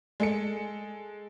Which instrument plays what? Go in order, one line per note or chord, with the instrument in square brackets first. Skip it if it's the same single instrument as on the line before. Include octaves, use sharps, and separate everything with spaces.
[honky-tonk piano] G#3 A4 C#7